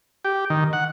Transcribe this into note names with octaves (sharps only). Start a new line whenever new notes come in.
G4
D#3
F#5